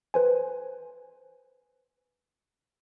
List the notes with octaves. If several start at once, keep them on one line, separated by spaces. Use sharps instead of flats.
B4 C5 G#5